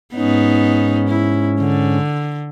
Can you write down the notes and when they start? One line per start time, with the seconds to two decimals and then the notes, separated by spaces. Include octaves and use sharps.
0.15 G#2 B3 C#4 D#4
1.09 E4
1.59 D3